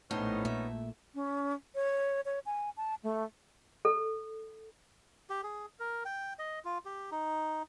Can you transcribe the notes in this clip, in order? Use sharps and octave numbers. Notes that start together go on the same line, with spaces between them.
A#1 A2 A3 B3 C#4 D#4 C5
A#2 E5
C#4
C#5
C#5
G#5
A5
A3
A4
G4
G#4
A#4
G5
D#5
F4
G4
D#4